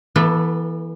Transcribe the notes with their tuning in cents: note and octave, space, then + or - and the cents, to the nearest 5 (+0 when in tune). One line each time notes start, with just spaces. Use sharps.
E3 +0 B3 -40 A4 +0